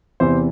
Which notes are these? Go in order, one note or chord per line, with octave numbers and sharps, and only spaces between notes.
E2 C3 E3 C5